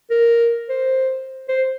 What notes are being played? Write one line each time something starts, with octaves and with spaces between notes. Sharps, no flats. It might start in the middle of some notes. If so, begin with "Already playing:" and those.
A#4
C5
C5